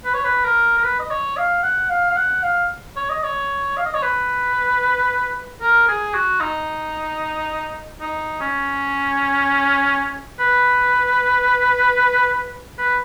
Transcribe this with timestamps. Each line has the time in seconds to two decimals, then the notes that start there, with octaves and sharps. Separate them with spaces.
0.05 B4
0.14 C#5
0.24 B4
0.44 A#4
0.77 A#4
0.84 B4
0.99 D#5
1.10 C#5
1.37 F5
1.63 F#5
1.90 F5
2.10 F5
2.16 F#5
2.43 F5
2.96 C#5
3.10 D#5
3.24 C#5
3.77 F5
3.86 D#5
3.94 C#5
4.02 B4
5.61 A#4
5.88 G#4
6.14 F#4
6.40 D#4
8.01 D#4
8.41 C#4
10.39 B4
12.78 B4